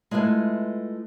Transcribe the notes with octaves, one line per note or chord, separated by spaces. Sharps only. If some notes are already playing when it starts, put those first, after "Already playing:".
G#3 A3 E4 F4 B4